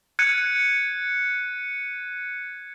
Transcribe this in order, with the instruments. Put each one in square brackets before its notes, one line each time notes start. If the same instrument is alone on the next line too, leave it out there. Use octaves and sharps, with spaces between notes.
[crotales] F#6 G#6 C#7 D#7